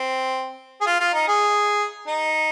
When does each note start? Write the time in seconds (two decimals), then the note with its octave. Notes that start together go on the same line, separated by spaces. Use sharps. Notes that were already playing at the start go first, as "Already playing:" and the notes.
Already playing: C4
0.81 G#4
0.86 F4
1.00 F4
1.14 D#4
1.28 G#4
2.08 D#4